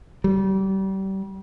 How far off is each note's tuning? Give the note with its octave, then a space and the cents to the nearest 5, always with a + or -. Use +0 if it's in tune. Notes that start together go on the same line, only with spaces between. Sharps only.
G3 -30